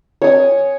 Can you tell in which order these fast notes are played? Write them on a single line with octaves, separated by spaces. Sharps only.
C#5 D#6 G#5